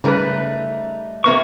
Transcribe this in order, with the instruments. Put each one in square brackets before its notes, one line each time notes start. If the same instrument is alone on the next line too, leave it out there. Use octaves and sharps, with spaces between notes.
[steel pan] C#3 A#4 B4 [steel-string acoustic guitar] G3 A3 D#4
[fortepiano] C3 A#3 B3 [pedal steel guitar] C#6